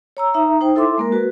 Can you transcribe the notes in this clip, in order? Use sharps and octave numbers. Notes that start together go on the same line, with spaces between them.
C#5 A#5 E6
D#4 E5 A#5
D#4 C5 G5
E4 A4 E5 C6 D6
G#3 A#3 A#4
F#4 B4